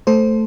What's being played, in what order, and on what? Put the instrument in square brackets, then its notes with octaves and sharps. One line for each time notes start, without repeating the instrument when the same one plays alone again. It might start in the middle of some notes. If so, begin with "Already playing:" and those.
[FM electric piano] A3 A4 C5